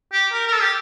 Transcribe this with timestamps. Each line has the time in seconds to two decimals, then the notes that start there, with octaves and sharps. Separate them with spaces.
0.13 G4
0.32 A#4
0.47 A#4
0.52 A4
0.62 G4